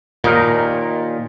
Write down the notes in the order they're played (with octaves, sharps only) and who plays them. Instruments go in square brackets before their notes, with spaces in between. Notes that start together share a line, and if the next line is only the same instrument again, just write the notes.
[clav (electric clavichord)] D#2 D#4 A#4 [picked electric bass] A#2